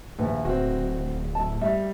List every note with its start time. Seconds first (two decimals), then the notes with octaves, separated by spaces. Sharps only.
0.19 A#1 D#2 B4 E5
0.45 D1 C4 F#4
1.35 E4 A5
1.61 G3 E5